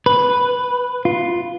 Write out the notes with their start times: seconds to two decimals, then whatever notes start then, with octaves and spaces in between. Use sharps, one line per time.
0.06 B4
1.05 F4